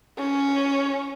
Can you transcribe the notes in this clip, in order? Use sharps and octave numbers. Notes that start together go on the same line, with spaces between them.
C#4